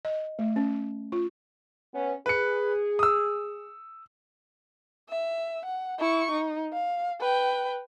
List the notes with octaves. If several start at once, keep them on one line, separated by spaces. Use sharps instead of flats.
D#5
A3
C#4
F4
B3 C#4
G#4 B4 C#7
D#6 E6
E5
F#5
E4 C#6
D#4
F5
B4 G5